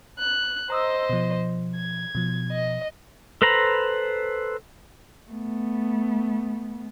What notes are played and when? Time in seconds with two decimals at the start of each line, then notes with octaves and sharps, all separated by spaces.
0.19 F#6
0.70 C5 D#5 A#5 D#6 E6
1.09 B2 F3
1.76 G#6
2.15 B2 F3
2.52 D#5
3.42 A4 B4 C5 A#5 B5
5.31 A3 B3